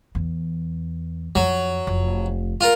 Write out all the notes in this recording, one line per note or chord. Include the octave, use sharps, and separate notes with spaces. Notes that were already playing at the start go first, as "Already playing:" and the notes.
E2
F2 F#3
F1
F4 A#4